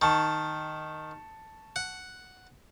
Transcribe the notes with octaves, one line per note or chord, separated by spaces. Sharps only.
D#3 A5 C#6
F#5